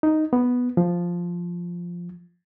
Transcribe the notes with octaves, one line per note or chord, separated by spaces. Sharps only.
D#4
B3
F3